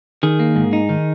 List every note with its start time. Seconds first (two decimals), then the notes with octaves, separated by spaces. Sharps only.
0.23 D#3 G#4
0.39 A#3
0.56 G#2
0.73 D#4
0.89 D#3